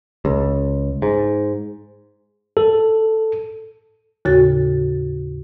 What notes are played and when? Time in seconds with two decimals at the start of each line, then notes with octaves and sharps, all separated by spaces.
0.25 C#2
1.02 G#2
2.57 A4
4.25 D#2 A2 C#3 F#4 A6